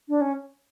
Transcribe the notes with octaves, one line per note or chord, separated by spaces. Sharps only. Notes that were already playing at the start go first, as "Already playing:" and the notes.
D4
C#4